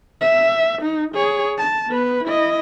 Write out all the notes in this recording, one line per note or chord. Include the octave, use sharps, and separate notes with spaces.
E5
D#4
G#4 C#5
A5
B3 B4
E4 D#5